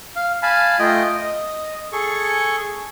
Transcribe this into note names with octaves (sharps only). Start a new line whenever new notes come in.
F5
F5 G#5 A5 B5
A3 F4 D#5 G5
D#5
G#4 A4 C#6